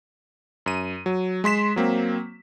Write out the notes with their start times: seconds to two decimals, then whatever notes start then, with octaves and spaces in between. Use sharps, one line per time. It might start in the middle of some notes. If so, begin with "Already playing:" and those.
0.66 F#2 D#7
1.06 F#3
1.44 G#3 C6 B6 E7
1.76 F#3 A#3 C4